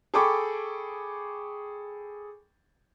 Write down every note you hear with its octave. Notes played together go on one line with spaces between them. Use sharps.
G#4 A4 G5 B5 C#6 D6